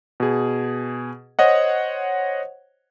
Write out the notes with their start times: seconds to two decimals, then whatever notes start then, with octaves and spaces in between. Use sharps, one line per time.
0.20 B2 G#4
1.39 C5 C#5 D#5 F#5